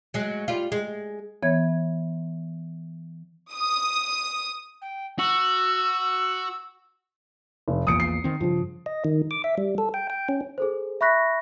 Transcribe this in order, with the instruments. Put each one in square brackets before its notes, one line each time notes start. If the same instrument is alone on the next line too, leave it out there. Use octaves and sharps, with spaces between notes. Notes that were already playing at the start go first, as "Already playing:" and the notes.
[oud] F#3 G#3
G3 F4
G#3
[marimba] E3 B3 C#5 G#6
[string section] D#6
[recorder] G5
[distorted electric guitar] F#4 [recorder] E6
[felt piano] F1
[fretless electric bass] A#1 E2 A#2 [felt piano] D#6 C#7 D7
[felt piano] C7
[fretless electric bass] D#3 C4
[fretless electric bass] G2 C#3 [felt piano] F3
[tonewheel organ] D#5
D#3
D6
E5
G3
A4
G5
G5
C#4
[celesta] G#4 A4 C5
E5 B5 C#6 F#6 A#6 B6